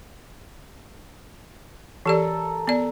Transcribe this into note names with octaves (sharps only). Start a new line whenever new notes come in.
E3 G4 A4 A#4 D5
B3 D5